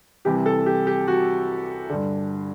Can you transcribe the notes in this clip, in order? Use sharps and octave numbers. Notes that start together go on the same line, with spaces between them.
C2 C3 E3 G4
A4
G4
G4
F#4
G2 D3